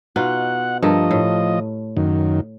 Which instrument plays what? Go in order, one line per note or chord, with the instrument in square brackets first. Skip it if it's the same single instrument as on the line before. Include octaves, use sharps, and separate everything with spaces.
[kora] B2 D#4 F4 [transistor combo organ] F#5
[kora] G2 A3 A#4 [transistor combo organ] F3 D#5
[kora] A2
[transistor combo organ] F#2 D#3